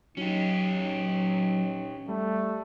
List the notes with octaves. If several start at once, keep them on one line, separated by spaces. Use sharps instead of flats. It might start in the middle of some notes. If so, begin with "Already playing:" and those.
F#3 C#4 D#4 G4
G3 A3